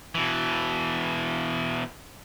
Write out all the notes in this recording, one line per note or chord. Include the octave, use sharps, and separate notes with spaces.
B2 E3